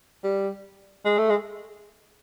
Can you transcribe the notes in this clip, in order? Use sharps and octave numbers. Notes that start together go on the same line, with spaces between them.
G3
G#3
A3
G#3